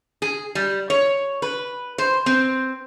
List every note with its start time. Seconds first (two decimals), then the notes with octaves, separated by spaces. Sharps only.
0.22 G#4
0.55 G3
0.90 C#5
1.42 B4
1.98 C5
2.26 C4